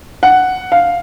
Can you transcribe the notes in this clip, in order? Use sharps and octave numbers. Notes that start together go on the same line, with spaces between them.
F#5
F5